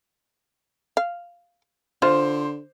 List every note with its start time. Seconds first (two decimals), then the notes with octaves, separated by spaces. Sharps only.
0.97 F5
2.02 D3 F4 C5